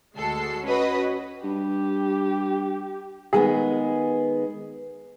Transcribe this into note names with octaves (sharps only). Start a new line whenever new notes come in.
D2 G#3 F#4 A4 C7
C#4 F#4 B4 D#5
G2 G4
D#3 G#3 B3 G#4